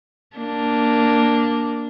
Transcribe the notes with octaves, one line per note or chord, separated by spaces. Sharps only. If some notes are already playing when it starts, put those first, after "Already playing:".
A#3 D4